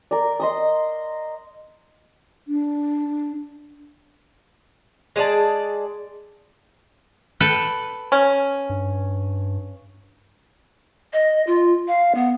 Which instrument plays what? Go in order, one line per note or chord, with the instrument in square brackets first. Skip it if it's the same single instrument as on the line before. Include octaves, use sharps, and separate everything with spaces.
[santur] A#4 D5
D#5 C6 D#6
[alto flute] D4
[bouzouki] G#3 G#4 D5 A5
[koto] A4 B4 G5
[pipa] C#4
[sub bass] G2
[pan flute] D#5
F4
F5
B3